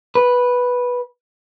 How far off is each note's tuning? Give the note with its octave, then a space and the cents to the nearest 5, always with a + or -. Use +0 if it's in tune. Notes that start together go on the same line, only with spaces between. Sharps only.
B4 -5